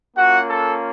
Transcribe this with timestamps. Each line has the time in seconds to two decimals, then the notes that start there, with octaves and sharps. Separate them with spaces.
0.16 A#3 C#4 F4 F#4 F#5
0.50 A4